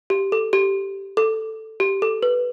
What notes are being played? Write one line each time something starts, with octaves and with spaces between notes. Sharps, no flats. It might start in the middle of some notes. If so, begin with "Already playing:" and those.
G4
A4
G4
A4
G4
A4
B4